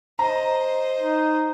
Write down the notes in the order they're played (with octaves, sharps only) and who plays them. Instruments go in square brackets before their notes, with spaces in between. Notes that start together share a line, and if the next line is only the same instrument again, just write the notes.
[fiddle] C5 D#5 [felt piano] A#5
[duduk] D#4